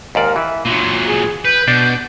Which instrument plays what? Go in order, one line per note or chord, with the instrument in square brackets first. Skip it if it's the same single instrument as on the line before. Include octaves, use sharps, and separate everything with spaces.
[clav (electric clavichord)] D#2 G#2 D5 [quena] A#4
[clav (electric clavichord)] E3 [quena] E5
[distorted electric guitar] A#2 F#3 [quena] C6
[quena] G#4
[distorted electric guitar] B4 [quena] G6
[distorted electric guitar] B2 [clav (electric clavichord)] D4